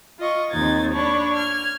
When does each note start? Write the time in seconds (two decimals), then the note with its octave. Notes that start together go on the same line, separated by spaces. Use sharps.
0.19 F4 D#5 C#6
0.51 D#2 C4 D#4 G#6 A6
0.92 D4 C#5 A5 B5
1.33 F6 G#6